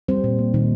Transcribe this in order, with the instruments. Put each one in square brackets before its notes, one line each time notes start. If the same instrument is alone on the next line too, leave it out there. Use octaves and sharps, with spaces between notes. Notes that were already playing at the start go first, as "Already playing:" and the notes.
[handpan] G3 C4 C5
A#2
A#3
A#2 D#3 D#4